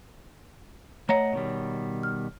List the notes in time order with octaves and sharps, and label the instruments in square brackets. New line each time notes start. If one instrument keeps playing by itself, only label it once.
[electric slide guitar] A3 D#5 F#5 [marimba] C#5 A#5
[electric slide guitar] B2 D#3 G3
[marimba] F6